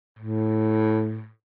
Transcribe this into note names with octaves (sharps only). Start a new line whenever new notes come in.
A2